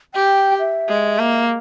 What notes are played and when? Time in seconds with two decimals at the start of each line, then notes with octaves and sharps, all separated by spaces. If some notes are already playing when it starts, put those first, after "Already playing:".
0.14 G4 G5
0.60 E5
0.88 G#3
1.18 A#3